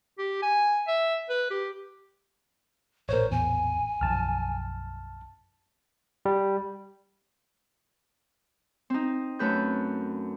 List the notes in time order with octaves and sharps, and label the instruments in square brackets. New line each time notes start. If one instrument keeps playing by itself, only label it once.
[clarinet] G4
G#5
E5
B4
G4
[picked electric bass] A1 A#2 [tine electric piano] A#4 C#5 [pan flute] C5
[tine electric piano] E2 [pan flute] G#5
[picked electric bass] B1 F#2 F3 [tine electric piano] A5 F6
[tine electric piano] G3
[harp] C4 D#4
F#2 A3 B4 E6 G6